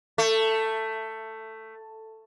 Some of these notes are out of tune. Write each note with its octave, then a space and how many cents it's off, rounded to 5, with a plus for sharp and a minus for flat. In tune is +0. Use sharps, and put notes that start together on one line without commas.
A3 +10